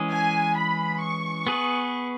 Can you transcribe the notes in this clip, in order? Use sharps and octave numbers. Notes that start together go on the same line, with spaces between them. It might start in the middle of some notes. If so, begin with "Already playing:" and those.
Already playing: E3 G#3 C#4 G#4
G#5
B5
C#6
B3 G#4 B4